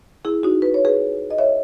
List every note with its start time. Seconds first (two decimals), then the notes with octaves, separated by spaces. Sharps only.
0.25 E4 G#4
0.43 D#4 F#4
0.62 B4
0.74 C#5
0.85 G#4 B4
1.31 D#5
1.38 C#5 E5